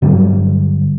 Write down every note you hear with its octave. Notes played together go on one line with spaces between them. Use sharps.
G2 D3 F#3 G3